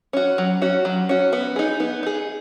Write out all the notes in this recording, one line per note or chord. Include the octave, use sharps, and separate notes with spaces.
C#4 F#4
F#3
C#4 F#4
F#3
C#4 F#4
B3
D#4 G#4
B3
D#4 G#4